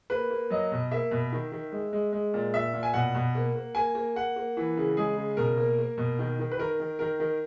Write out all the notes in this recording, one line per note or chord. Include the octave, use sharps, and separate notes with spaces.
A#3 B4
A#3
F#3 D#5
B2
A#3 E5
B2
D#3
D#3
G#3
G#3
G#3
A#2
A#2 E5
A#2
G#5
B2 F#5
B2
A#3
A#3
A#3 G#5
A#3
A#3 F#5
A#3
E3
C#3
G#3 G#4
C#3
B2 A#4
A#3
A#3
B2
D#3
D#3
B4
D#3 A#4
D#3
D#3 A#4
D#3